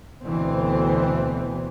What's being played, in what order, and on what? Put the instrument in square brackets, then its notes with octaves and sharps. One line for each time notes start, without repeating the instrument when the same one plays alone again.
[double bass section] D2 B2 D3 E3 C4